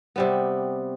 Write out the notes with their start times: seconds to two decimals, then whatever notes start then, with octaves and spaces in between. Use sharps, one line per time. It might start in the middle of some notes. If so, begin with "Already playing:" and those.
0.16 C3 G3 B3